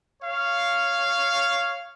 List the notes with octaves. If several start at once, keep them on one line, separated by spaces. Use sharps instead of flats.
C#5 F5